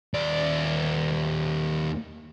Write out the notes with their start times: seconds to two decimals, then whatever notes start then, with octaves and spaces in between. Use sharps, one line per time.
0.14 D#2 D5